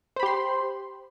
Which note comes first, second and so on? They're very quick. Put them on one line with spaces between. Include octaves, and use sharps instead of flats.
C5 B5 G4 C6